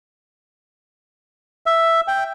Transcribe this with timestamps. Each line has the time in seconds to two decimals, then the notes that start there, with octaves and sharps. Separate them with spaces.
1.66 E5
2.08 G5